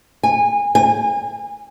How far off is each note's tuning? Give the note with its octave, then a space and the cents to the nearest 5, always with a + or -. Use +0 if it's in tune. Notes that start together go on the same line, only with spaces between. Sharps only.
G#5 -25
G#5 -35